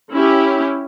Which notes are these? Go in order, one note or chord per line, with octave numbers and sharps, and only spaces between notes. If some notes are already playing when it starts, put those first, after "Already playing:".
C#4 E4 G4